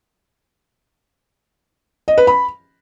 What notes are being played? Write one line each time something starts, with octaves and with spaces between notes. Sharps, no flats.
D#5
B4
B5